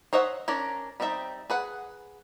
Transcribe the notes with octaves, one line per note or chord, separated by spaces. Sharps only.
C5 C#5 D#5 E5 F#5
C#4 D4 A#4 D5
G3 C4 D#4 A4 E5
G#4 B4 F#5